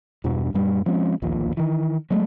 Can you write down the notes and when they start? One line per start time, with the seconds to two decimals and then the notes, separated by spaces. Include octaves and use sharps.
0.24 E2 G2 B2
0.54 F#2 A#2 G3
0.86 F3 G#3 C4 C#4
1.22 D1 A#1 D#2 A#2
1.57 D#3 E3
2.10 F#3 G#3 A3